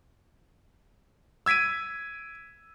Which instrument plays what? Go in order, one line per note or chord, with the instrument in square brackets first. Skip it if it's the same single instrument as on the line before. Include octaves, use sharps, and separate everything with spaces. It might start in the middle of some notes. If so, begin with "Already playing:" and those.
[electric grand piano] E6 G#6 B6 D7 D#7